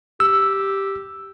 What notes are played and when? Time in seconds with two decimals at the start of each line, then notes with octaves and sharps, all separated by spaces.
0.20 G4 E6